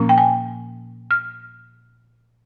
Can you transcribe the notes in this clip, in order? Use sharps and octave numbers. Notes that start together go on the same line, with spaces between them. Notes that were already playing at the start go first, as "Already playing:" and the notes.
Already playing: A#2 F3 A#3 C#4
G5
G#5
F6